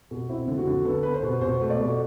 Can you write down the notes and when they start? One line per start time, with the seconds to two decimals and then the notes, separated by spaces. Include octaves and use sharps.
0.11 B2
0.29 C4 E4
0.48 D3
0.58 F#4
0.67 D3
0.85 B3 A4
1.03 B3 B4
1.14 C5
1.23 B2
1.41 B2 C5
1.61 A3
1.70 D5
1.79 B2